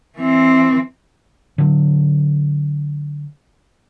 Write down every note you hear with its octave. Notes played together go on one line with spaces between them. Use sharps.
E3 C4
D3 F#3